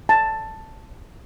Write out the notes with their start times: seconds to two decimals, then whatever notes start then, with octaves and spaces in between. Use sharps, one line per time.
0.09 A5